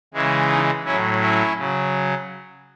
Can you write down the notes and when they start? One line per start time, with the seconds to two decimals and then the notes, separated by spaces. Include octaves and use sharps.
0.14 C#3 E3 G#3
0.50 D#4
0.85 A2 F#3 C#4 E4
1.21 C#4 E4
1.57 C#3 F#3